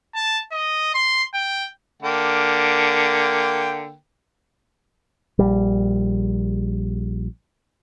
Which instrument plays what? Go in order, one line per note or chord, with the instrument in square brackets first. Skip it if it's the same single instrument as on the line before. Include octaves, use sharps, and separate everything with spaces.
[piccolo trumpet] A5
D#5
C6
G5
[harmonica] D3 A#3 G5
[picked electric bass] A#1 G3